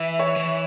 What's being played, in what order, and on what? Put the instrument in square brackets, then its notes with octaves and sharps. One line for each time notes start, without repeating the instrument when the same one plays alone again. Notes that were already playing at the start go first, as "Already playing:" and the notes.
Already playing: [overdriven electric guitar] E3 [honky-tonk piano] E5
[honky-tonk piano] C#5
[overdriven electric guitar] E3